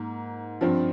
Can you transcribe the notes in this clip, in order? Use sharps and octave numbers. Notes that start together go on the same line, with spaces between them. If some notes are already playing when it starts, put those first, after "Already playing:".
Already playing: G#2 A#3
G2 F3 C4